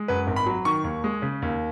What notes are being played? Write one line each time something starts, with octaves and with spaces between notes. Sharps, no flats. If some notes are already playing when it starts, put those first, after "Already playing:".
Already playing: G#3
F#2 B4
G#1
B5
F#3
D#3 C#6
D#2
G#3
C#3
D#2